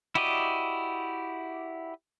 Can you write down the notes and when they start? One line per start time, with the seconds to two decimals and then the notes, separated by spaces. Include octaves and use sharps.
0.15 E4 F#4 G4 D5 D#5